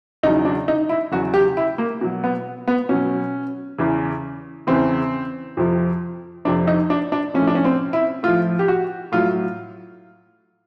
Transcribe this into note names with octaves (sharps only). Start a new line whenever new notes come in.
E2 C#3 F#3 D#4
D4
D#4
E4
E2 C#3 F#3 F#4
G4
E4
A#3
B2 F#3
B3
B3
B2 F#3 C#4
E2 C#3 E3
E2 C#3 E3 C4
F2 C3 F3
F2 C3 F3 D4
D#4
D4
D4
A2 F3 C#4
D4
C#4
C4
E4
A2 F3 F4
G4
F#4
A2 F#3 F4